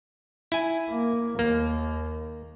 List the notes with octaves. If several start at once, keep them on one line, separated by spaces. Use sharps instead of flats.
E4 G#5
A#3
D#2 A#3